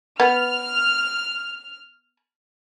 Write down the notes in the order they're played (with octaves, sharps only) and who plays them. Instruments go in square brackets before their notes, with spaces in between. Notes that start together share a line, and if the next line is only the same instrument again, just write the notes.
[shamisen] B3 [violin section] F6